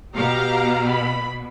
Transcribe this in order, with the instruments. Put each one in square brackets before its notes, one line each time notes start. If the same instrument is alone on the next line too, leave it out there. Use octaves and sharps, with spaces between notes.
[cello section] B2 [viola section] G4 F5 A#5
[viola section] B5